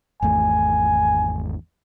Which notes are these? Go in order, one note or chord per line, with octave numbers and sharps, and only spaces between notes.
G#1 E2 A3 G#5